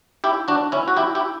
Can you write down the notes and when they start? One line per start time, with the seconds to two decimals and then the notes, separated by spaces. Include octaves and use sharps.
0.24 E4 G4
0.48 D4 F#4
0.72 C#4 E4
0.88 F#4
0.97 E4 G4
1.15 E4 G4